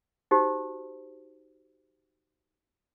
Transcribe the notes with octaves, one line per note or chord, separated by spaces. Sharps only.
D#4 F#4 G4 C5